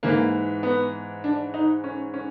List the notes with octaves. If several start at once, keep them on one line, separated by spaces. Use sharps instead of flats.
G#2 E3 A#3
B3
D4
D#4
C#4
C#4